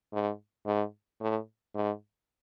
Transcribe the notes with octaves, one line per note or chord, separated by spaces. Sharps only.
G#2
G#2
A2
G#2